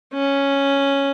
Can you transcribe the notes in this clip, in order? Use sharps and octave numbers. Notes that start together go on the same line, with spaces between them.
C#4